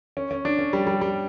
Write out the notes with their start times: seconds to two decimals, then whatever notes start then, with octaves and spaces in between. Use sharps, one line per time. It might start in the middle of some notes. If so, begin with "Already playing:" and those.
0.17 C#4
0.31 C#4
0.45 D4
0.59 C#4
0.73 G3
0.87 G3
1.01 G3